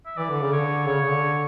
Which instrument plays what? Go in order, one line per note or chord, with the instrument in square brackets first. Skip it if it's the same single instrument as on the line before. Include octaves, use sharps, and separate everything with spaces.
[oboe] E5
[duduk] E3 [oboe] D5
[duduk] D3
C#3
[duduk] D3 [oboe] C#5
[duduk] C#3 [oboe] C#5
[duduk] C#3
D3